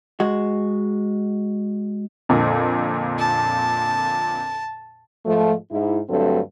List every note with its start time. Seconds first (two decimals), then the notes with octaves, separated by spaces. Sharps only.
0.20 G#3 F#4
2.29 F2 A#2 D3
3.18 A5
5.25 G#2 F3 A3
5.71 G#2 E4
6.09 D2 G2 F#3 A3 C4 A4